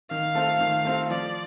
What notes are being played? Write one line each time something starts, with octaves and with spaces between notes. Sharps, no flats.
D#3 F5
A3 C4 F4
D#3
A3 C4 F4
F3 D5